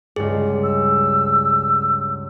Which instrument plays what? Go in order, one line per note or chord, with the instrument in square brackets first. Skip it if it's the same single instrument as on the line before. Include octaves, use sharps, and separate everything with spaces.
[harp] C#2 G2 [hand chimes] G#4
[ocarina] E6